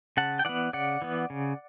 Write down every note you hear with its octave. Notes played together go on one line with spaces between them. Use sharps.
C#3 F#5 A5
G5
E3 B3 D5 F#5
C#3 D5 F#5
E3 B3
C#3